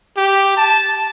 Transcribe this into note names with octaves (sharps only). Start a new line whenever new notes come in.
G4
A5